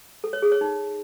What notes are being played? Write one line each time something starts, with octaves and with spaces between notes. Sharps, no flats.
A4
C#5
G#4
C#5
D#4